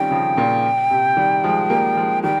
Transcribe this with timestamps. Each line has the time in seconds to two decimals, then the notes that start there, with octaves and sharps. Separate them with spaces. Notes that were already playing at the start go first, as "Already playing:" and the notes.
Already playing: D#3 G3 C4 C#4 D#4 F4 G5
0.11 C#3 F3
0.37 A#2 C#3
0.90 C3
1.17 D#3 G3
1.44 F3 G#3
1.70 G3 A#3
1.97 F3 G#3
2.23 D#3 G3 G5